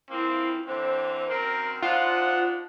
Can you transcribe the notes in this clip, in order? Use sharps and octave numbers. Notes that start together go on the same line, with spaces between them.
E3 F3 A#3 C4 E4
D3 E3 C4 C5
F#2 D#3 C4 A#4
D4 D#4 F4 C5 F#5